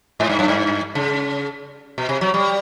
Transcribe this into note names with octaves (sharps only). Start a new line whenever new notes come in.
G#2
G2
F#2
G2
C#3
B2
C3
F#3
G3